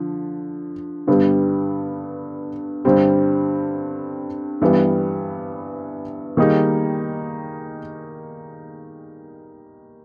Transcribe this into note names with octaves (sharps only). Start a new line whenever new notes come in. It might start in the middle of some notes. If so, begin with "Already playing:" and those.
Already playing: D3 F3
G2 D3 G3 B3
G2 D3 G3 C4
G2 E3 G3 B3
D#3 G3 A#3 D#4 G#4